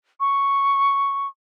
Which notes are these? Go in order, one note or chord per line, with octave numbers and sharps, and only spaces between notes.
C#6